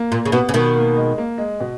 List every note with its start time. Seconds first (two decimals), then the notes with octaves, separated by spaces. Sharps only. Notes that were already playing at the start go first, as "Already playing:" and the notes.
Already playing: A#3
0.12 A#2
0.26 C#3
0.32 B2 B3
0.49 C#3
0.54 B2 D#3
0.76 A#3
0.97 G#3
1.18 A#3
1.38 G#3
1.60 B2